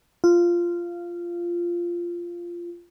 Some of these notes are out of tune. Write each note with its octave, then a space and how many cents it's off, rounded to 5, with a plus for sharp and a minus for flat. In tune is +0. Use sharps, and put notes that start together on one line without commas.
F4 -10